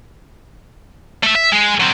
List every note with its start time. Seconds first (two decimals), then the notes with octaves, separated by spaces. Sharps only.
1.23 A3 E5
1.35 E5
1.52 G#3
1.80 F#3 C4